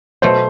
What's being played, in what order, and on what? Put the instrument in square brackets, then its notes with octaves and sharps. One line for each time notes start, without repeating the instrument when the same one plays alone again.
[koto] B2 F#3 A3 [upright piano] C5